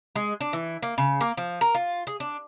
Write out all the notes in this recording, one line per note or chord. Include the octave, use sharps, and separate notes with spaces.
G#3
D4
E3
A#3
C#3
A#3
F3
A#4
F4
G#4
D4